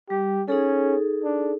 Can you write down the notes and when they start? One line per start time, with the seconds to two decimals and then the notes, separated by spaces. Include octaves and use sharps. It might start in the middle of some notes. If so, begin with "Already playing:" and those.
0.10 G3 G4
0.48 C#4 D#4 G#4 A4
1.24 D4